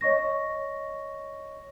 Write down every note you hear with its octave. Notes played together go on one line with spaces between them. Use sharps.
C#5 D#5 C#6 A#6